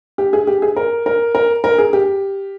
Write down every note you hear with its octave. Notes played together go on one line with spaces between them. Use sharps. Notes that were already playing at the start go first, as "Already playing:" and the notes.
G4
G#4
G4
G#4
A#4
A#4
A#4
A#4
G#4
G4